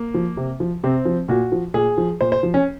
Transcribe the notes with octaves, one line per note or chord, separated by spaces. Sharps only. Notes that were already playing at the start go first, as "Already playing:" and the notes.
Already playing: A#3
F3
C3
F3
C3 C4
F3
A#2 F#4
F3
A#2 G#4
F3
A#2 C5
C5
F3
C#4